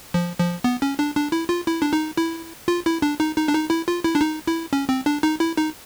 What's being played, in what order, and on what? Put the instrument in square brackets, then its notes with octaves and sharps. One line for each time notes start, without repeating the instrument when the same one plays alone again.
[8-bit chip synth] F3
F3
B3
C#4
D4
D4
E4
F4
E4
D4
D#4
E4
F4
E4
D4
D#4
D#4
D4
D#4
E4
F4
E4
D4
D#4
E4
C#4
C4
D4
D#4
E4
D#4